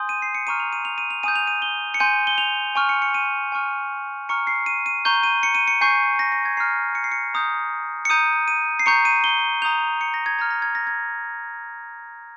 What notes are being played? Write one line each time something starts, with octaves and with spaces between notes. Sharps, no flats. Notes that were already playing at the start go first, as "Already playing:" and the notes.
Already playing: G#5 C6 D#6 G6
D#7
C7
C#7
A#5 C#6 F6 D#7
F7
D#7
F7
D#7
F7
G#5 D#6 G6 D#7
F7
D#7
G7
C#7
G#5 C6 G6 D#7
G7
F7
G#5 C#6 F6
C#7
C#7
D#7
G#5 C#6 F6
A#5 C#6 F6 C#7
C7
D#7
D#7
A#5 C#6 G6 G7
D#7
C#7
D#7
C#7
G#5 C#6 G6 C7
A#6
A#6
G#6
A#5 F6 C7
C#7
C7
C#7
A#5 D#6 G6
C#7
A#5 D#6 G6 D#7
D#7
C7
A#5 C#6 G6 C#7
D#7
G7
A#5 D#6 G6 F7
C#7
A#6
G#6
A#5 F6 G#6
A#6
G#6
A#6
G#6